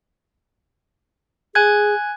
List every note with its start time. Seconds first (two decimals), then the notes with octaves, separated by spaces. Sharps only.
1.55 G#4 G#5 F#6 G#6